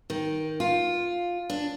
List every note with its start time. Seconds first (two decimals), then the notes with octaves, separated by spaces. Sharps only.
0.10 D#3
0.60 F4
1.50 D4